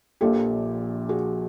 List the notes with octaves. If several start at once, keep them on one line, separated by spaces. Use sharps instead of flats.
A#1 A#2 F3 G4 A4
F#4 G#4